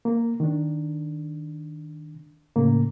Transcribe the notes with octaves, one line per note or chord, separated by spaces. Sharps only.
A#3
D#3 D4
A2 C#3 A#3